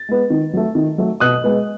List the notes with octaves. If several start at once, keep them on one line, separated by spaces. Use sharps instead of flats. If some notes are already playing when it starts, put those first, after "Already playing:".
Already playing: A6
G#3 B3
D#3
F#3 A3
D#3
F#3 A3
B2 D#6 F#6
G#3 B3